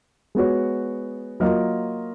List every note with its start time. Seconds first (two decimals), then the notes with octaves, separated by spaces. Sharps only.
0.35 G#3 B3 F#4 C#5
1.40 F#3 A#3 F4 A#4 D#5